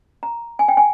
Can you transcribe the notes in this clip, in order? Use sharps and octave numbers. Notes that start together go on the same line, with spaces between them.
A#5
G#5
G5
G#5